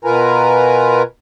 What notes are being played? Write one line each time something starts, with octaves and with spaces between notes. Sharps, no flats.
B2 F4 A#4 B4 G#5 A#5